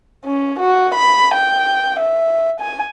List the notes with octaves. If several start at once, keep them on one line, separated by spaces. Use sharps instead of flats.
C#4
F#4
B5
G5
E5
G#5